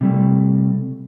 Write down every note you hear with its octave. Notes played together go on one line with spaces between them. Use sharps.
C3 G3 A3